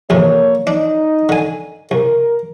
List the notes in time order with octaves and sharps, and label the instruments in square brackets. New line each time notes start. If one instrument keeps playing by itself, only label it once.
[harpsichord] A1 F2 C3 [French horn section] A#3 C#5
[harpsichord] D4 [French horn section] D#4 D#5
[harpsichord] D3 G#5
[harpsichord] C2 [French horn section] A#4